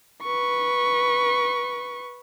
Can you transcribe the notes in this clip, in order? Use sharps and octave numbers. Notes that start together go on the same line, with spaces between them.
B4 C#6